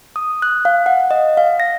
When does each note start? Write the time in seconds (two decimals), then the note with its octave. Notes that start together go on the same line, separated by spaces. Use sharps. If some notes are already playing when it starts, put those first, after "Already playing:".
0.16 D#6
0.42 F#6
0.65 F5
0.86 F#5
1.11 D#5
1.37 F5
1.60 A#6